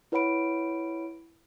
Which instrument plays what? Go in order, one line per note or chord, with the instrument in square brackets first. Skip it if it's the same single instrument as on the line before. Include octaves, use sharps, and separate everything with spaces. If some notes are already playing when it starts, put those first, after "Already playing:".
[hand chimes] E4 B4 C#5 F#5 B5 D7